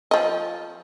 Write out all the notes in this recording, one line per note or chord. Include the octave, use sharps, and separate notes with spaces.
F3 D#5